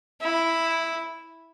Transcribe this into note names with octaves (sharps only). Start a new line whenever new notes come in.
E4